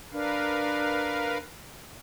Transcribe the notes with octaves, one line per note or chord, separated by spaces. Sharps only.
D4 A#4 B4 F5